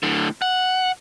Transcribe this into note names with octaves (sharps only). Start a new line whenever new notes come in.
A2 D3
F#5